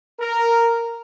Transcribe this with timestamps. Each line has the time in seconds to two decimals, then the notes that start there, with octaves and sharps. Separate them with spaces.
0.20 A#4